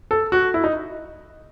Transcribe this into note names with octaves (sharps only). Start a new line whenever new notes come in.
A4
F#4
E4
D#4